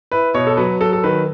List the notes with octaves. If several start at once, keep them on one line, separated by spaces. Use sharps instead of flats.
E4 B4
B2 C#5
A4
F#3 B4
F#3 A4
A4
D#3 B4